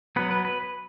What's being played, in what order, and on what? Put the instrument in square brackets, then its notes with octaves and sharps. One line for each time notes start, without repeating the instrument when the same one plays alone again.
[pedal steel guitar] F#3 B3 B4
B4
B4